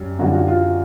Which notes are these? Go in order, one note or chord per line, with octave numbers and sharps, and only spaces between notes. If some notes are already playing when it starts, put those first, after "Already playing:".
Already playing: F#2 G3
F#2 D3 G3 F#4
F4
F#4
F4